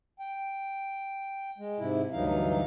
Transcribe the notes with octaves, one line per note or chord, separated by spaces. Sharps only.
G5
G#3
G#2 C3 E4
D2 G2 E3 F#3 D#4 F5